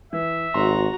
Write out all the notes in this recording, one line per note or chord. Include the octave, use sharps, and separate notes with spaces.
E3 E5
G#1 F#4 A#5 C6